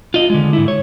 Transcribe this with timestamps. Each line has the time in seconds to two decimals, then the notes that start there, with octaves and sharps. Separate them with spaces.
0.14 F4 D#5
0.30 D3 G#3
0.53 G#2 E4
0.68 C#5